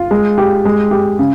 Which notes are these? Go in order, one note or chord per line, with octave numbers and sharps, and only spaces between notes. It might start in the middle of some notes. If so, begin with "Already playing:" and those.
Already playing: F4
G#3
G4
G#3
G4
C#3